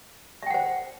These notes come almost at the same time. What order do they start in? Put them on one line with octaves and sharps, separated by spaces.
E5 G5 F#5 C5